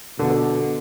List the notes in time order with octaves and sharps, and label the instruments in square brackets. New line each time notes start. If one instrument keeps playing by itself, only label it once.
[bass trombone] B2 [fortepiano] D3